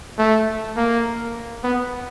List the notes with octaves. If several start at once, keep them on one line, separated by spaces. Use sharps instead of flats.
A3
A#3
B3